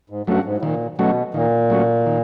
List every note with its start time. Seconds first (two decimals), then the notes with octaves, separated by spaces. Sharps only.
0.10 G#2
0.27 G2 F#3 A3 C#4 F#4
0.45 G#2
0.58 A2
0.62 A#2 D#3
0.98 B2 F#3 A3 C#4 F#4
1.34 A#2 D#3
1.70 F#3 A3 C#4 F#4
2.06 D#3